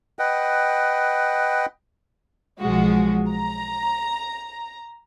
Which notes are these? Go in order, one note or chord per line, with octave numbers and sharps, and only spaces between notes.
B4 D#5 F#5 G5
B1 F3 G#3 F#4
A#5